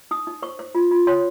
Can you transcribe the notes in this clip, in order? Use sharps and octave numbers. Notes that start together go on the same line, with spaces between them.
D#4 D#6
D#4
C5 C#6
C5
F4
F4
C#5 C6